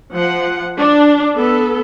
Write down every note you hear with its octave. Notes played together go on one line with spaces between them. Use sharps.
F3 F#5
D4
B3 A4